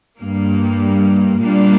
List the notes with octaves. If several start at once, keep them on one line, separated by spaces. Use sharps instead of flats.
G2 G3 A#3
A#2 G3 A#3 D4